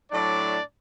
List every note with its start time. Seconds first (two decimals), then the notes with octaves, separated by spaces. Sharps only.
0.11 A2 F#3 D4 D5